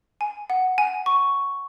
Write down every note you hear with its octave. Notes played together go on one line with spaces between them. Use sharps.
G#5
F#5
G#5
C#6